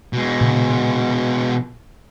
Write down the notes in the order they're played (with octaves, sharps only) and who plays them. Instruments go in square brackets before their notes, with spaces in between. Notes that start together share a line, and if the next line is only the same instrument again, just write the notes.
[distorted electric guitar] B2 G#3
[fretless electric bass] A#2 C#3 B3